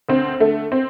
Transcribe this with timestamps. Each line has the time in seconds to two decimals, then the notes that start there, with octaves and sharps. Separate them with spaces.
0.09 D2 C4
0.40 D3 A3
0.72 C4